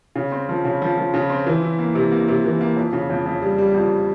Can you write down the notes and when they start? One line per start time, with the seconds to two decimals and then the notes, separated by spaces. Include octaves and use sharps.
0.15 C#3
0.32 C4
0.49 F3
0.65 C#3
0.82 F3
0.97 F3
1.14 C#3
1.30 C4
1.47 E3
1.62 E4
1.79 A#3
1.95 C3
2.12 A#3
2.28 C3
2.44 E3
2.61 A#3
2.77 F2
2.93 C#3
3.10 F2
3.26 F2
3.42 G3
3.58 G3
3.75 F2